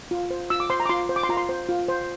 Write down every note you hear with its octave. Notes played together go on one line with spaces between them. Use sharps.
F4
C5
F4 E6
D6
C5 C6
A#5
D6
F4 C6
C5
D6
C6
F4 A#5
C6
C5
F4
C5